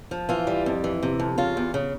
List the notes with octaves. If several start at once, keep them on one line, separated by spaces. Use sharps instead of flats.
F3
E3 F4
G3
F2
E3
C3
F2
C#3 F4
E2
C#3